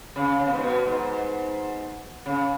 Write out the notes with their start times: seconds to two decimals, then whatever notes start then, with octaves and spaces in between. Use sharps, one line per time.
0.16 C#3
0.39 C#3
0.47 B2
0.54 G#2
0.61 B2
0.86 G#2
2.26 C#3